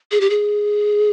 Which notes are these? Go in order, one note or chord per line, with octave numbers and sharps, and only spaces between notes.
G#4
G4
G#4